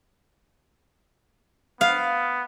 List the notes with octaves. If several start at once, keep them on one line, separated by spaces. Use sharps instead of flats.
B3 F5